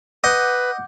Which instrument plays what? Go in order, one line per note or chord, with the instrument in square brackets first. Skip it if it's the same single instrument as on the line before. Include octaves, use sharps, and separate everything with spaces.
[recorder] B4 [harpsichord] D#5 [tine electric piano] F#5 D6 G6